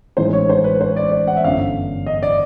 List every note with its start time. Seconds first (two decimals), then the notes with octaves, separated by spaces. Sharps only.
0.17 A1 G#2 E3 C5
0.33 C#5
0.49 C5
0.64 B4
0.81 C5
0.96 D5
1.12 D5
1.27 F#5
1.37 E5
1.44 G1 F#2 D3 F5
2.06 D#5
2.23 D5